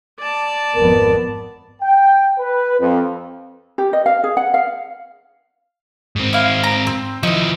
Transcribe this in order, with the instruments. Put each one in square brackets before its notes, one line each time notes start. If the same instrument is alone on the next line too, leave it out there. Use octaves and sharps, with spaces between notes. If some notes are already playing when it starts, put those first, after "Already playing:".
[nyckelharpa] D5 A5
[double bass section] G#1 F2 B3 [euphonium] A#4
[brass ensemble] G5
B4
F2
[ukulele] G4
D#5
F5
G#4
F#5
F5
[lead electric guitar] G#2 C4
[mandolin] E4 F5
A#5
C4
[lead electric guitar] F3 E4 [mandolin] D#4 F#4